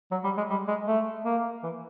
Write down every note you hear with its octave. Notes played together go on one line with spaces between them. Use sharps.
F#3
G3
G#3
G3
G#3
A3
A#3
E3